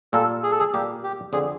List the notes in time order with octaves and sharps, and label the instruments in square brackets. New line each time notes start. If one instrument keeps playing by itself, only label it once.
[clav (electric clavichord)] A#2 G3 A#3 [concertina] A4
[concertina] G#4
A4
G#4
[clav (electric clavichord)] A#2 G3 A#3 [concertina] G4
[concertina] G4
[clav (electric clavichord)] F2 D3 G3 C4 [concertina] G#4